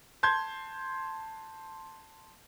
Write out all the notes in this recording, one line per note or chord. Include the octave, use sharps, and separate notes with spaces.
A5 C6 G6 G#6